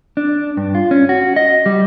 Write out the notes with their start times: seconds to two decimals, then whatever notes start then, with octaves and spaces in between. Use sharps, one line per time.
0.17 D4
0.57 G2
0.75 F4
0.91 C#4
1.09 F#4
1.36 D#5
1.66 G3